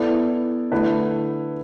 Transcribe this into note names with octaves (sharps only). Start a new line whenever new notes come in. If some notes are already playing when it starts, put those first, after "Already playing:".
Already playing: B3 E4 A4 D5
D3 A3 E4 B4